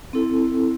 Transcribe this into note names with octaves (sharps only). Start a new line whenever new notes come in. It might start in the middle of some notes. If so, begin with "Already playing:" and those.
C4 E4 A4